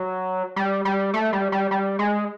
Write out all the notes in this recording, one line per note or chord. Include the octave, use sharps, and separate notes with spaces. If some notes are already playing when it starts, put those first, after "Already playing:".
Already playing: F#3
G3
G3
A3
G3
G3
G3
G#3